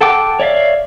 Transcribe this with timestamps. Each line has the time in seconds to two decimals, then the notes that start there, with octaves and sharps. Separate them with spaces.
0.01 A4 F#5 G5 D6
0.40 C#5 D5 E5 F5